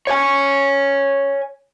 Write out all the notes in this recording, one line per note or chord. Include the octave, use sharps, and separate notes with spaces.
C#5 G#5